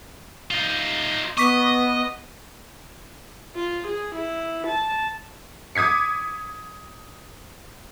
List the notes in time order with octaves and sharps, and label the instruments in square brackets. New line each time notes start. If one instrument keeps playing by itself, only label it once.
[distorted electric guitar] D#4 F4
[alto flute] B3 [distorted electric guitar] D#5 [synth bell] C#6 D6 B6
[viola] F4
G#4
E4
A5
[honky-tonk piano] D6 D#6 G#6 B6 C#7